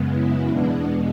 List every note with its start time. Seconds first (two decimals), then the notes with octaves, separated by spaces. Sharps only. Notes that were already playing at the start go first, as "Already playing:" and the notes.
Already playing: F#2 C#3 G#3 B3
0.12 E4
0.49 E2 B2 G#3 B3 D4